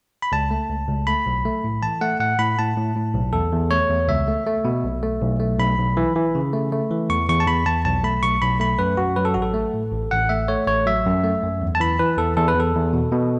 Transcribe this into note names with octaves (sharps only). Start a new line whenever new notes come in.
B5
C#2 A5
A3
C#2
C#2
A3 B5
B1
A3
A2
E3 A5
A3 F#5
A2 F#5
A2 B5
A2 A5
A2
A2
B1
E2 A4
E2
A3 C#5
E2
C#2 E5
A3
A3
B2
B1
A3
B1
A3
B1 B5
B1
E3
E3
C#3
A3
A3
E3
E2 C#6
E2 C#6
A5
E2 B5
E2 A5
B1 A5
A3 B5
B1 C#6
B1 B5
A3 B5
F#2 B4
F#2 F#4
F#3 B4
A4
A1 F#4
A4
A3
A2
A1
A1 F#5
A3 E5
A3 C#5
A1 C#5
F#3 E5
F#2
A3
F#2
E2
A5
E3 B5
E3 B4
E2 A4
E2 A4
B4
E2 A4
E2
B2
B2